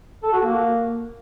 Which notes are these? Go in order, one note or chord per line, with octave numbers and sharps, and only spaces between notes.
A4
F#4
A#3